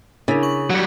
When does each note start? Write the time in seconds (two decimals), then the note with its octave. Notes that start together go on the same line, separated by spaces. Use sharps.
0.28 C#3 D4 E4 A#4
0.43 C#6 F#7
0.70 F#3 G3